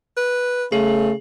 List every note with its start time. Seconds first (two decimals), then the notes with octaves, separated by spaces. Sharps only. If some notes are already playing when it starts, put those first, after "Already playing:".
0.17 B4
0.72 C#3 A3 G#4